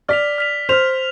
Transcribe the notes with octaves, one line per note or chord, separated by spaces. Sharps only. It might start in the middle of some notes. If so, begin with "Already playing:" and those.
D5 F6 B6 F7
F6 B6 F7
C5 F6 B6 F7